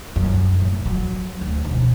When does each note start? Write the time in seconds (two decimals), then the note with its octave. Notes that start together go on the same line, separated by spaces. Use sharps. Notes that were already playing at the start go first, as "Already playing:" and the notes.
0.16 F#2
0.61 A2
0.86 F#3
1.41 D2
1.65 E1